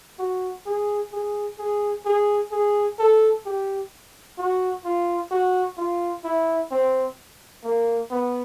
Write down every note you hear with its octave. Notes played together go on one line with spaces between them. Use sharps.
F#4
G#4
G#4
G#4
G#4
G#4
A4
G4
F#4
F4
F#4
F4
E4
C4
A#3
B3